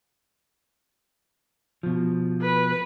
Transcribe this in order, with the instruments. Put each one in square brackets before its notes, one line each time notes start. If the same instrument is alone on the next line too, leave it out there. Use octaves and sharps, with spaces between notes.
[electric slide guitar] B2 F3
[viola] B4